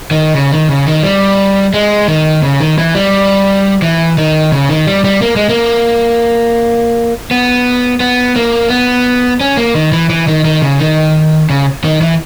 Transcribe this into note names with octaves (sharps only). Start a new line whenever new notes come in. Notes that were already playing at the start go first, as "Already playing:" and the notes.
D#3
C#3
D#3
C#3
D#3
G3
G#3
D#3
C#3
D#3
E3
G3
E3
D#3
C#3
D#3
G3
G3
A#3
G#3
A#3
B3
B3
A#3
B3
C#4
A#3
D#3
E3
E3
D#3
D#3
C#3
D#3
C#3
D#3
E3